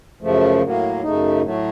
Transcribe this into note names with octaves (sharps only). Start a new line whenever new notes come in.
F#2 C#3 F3 A3
A2 F#3 A#3
F#2 C#3 A3 D#4
A2 F#3 A3